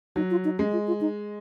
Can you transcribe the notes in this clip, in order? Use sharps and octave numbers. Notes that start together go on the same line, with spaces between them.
F#3 D#4
F4
D#4
G#3 C#4
F4
F4
D#4